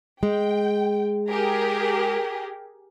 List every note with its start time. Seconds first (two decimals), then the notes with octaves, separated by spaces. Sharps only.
0.23 G#3 G5
1.29 G4 G#4 A#4